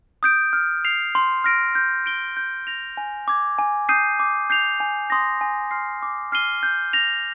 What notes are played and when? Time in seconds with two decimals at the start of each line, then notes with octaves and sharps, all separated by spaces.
0.23 D#6 G6 D7
0.53 F6
0.85 C7 F7
1.15 C6
1.44 F6 A#6 D7
1.75 G6
2.06 D7 G7
2.37 G6
2.67 A#6 F7
2.97 G#5
3.28 D6 G#6
3.59 G#5
3.89 D#6 G6 C7 D#7
4.20 D6
4.50 G6 C7 F7
4.80 G#5
5.10 C6 D#6 A#6
5.41 G#5
5.71 C6 F6 C7
6.03 D6
6.32 F6 C7 D#7 G7
6.63 G6
6.93 A#6 F7